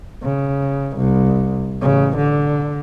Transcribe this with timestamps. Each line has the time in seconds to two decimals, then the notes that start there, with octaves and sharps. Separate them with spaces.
0.22 C#3
0.97 C2
1.82 A1 C#3
2.17 D3